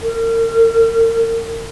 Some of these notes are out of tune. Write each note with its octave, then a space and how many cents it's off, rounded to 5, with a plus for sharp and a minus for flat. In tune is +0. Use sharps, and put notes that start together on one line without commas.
A#4 -35